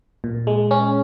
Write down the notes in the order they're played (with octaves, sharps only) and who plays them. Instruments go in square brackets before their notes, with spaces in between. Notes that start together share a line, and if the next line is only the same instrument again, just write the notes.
[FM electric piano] A#2
G#3
C#4